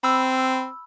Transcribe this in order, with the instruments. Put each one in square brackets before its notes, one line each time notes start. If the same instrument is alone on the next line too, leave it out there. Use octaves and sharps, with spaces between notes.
[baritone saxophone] C4 [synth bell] B5 E6